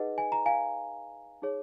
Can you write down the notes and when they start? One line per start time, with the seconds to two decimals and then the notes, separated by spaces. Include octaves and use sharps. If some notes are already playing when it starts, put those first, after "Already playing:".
Already playing: D#4 G#4 B4 D#5 F#5
0.18 G#5
0.32 A#5
0.46 F5 G#5
1.42 D#4 G#4 C#5